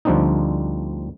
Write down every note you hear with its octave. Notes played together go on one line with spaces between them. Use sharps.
D2 F3 G3 C4 D4 D#4